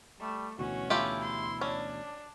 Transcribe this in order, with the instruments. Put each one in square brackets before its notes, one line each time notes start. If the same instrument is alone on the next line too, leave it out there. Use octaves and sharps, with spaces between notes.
[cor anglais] G3 [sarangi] A3
[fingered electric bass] D2 B2 E3 [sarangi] C#4 [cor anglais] F#4
[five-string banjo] A3 F4 G4 [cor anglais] E4
[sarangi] C6
[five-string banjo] C#4 [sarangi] D4